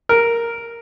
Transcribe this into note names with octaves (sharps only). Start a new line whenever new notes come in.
A#4